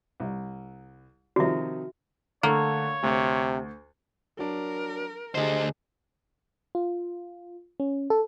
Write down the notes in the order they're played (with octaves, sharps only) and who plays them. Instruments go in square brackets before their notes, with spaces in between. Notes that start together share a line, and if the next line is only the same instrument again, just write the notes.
[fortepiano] C2
[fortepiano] C3 D#3 F3 [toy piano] F#4 E5
[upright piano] D3 A3 [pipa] A#3 [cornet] C#5
[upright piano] D2 [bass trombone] C3
[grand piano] F#3 D4 [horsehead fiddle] A#4
[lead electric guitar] D2 C5 [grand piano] D3 G4 G#4 [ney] D#5
[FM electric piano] F4
C#4
A4